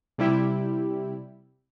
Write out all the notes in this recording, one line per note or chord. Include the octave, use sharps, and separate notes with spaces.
C3 G3 E4 G4